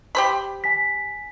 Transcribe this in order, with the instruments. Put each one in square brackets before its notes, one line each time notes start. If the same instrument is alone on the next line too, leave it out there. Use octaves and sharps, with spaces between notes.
[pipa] G4 C5 B5
[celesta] G#5 B6